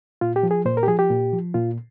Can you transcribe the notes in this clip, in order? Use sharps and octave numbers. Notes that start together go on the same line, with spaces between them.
A#2 F4
G4
F3
G#4
A#2 C5
A#4
G4
F3 G#4
G4
A#2
F3
A#2 F4